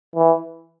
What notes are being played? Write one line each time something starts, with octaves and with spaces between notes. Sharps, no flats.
E3